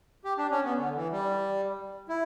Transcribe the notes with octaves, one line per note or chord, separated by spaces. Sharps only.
G4
D4
C#4
B3
D3
E3
G3
E4